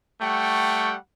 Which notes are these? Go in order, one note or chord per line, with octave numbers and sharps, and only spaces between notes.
G3 A3 F#5 G5 C#6